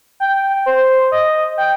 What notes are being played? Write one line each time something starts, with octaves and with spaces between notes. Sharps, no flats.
G5
C5
D#5
G5